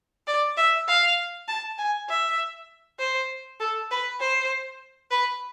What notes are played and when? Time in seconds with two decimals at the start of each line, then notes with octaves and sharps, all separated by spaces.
0.27 D5
0.57 E5
0.88 F5
1.48 A5
1.78 G#5
2.09 E5
2.99 C5
3.60 A4
3.91 B4
4.20 C5
5.11 B4